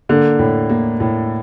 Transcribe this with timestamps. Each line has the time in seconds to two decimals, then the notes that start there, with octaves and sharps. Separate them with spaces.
0.09 D3 A#3
0.39 A2
0.69 A#3
1.00 A2